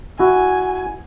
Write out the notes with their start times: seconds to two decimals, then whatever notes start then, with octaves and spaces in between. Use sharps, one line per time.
0.19 E4 F#4 G#5